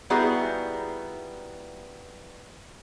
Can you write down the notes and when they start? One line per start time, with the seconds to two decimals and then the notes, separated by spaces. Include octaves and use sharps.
0.10 G3 B3 D#4 E4 F#4 G#4